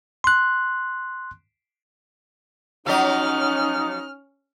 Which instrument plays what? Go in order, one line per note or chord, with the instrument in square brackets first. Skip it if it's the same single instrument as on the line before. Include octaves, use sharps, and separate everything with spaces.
[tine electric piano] C6 F#6
[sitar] F3 F#3 D#5 [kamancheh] C#4 F6 [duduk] D#4